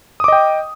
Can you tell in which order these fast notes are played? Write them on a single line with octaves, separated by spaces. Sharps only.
D#6 D6 D#5 G5